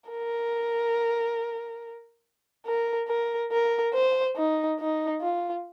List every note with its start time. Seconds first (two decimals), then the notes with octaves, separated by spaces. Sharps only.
0.10 A#4
2.66 A#4
3.08 A#4
3.52 A#4
3.94 C5
4.37 D#4
4.79 D#4
5.22 F4